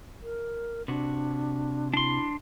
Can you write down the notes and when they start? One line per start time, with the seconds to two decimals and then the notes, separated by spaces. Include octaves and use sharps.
0.22 A#4
0.88 C3 D4 F#4
1.94 D4 E4 C6